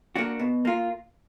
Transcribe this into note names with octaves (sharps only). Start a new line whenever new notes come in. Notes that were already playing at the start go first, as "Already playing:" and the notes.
A#3 D4 F#4
B2
A#3 F4